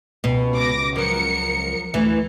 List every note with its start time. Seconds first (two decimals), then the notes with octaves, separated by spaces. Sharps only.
0.24 C#2 B2
0.55 D6 A#6
0.96 F3 F#3 A#4 C#7
1.94 D2 E3 A3